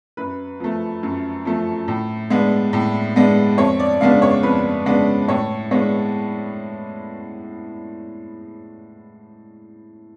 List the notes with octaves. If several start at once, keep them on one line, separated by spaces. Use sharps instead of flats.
F#2 B4
F3 A3
F#2
F3 A3
A2
G#3 B3 D4
A2
G#3 B3 D4
F2 C#5
D5
C#3 G#3 B3 D4 F5
C#5
F2 B4
C#3 G#3 B3 D4
A2 C#5
G#3 B3 D4 C#5